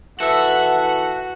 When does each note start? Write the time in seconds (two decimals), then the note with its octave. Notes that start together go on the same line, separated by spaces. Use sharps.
0.20 E3 F#4 A4 E5 F#5